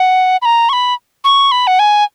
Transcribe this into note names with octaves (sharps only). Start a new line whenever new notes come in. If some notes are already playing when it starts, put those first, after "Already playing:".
Already playing: F#5
B5
A#5
C#6
B5
C#6
B5
F#5
G#5